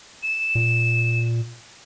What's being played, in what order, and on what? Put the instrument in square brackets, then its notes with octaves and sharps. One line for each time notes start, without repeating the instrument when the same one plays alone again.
[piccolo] E7
[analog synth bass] A#2